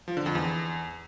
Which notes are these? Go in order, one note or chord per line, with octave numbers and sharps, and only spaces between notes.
F3
D3
F2
E2